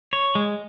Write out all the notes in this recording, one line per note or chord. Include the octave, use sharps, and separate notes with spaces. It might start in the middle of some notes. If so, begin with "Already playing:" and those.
C#5
G#3